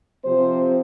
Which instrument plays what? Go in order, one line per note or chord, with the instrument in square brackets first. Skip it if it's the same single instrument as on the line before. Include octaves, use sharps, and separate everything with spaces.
[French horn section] C3 F3 C4 C5